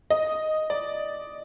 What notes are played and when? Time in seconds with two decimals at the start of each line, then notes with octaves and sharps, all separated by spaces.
0.10 D#5
0.70 D5